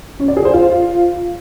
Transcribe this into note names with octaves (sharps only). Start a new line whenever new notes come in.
C#4
D5
G#4
C5
F4